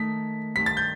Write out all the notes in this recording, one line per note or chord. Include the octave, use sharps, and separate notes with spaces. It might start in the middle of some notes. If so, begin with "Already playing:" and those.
Already playing: D#3 A3 D#4 B6
G2 D#3 A3 C4 B6
A6
G6